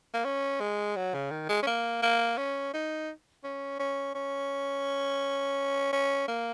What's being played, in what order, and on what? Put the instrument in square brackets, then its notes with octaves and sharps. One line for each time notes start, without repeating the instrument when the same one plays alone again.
[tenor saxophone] A#3
C#4
G#3
F#3
C#3
D#3
G#3
C#4
A#3
A#3
C#4
D#4
C#4
C#4
C#4
C#4
A#3